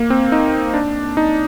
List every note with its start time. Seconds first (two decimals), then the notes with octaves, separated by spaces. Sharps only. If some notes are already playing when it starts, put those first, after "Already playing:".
Already playing: A#3
0.10 C4
0.32 D#4
0.74 D4
1.17 D#4